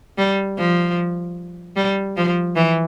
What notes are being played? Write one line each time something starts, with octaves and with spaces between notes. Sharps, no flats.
G3
F3
G3
F3
E3